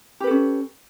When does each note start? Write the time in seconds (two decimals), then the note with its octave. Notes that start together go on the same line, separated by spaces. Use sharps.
0.20 G4
0.24 B4
0.27 A4
0.31 C#4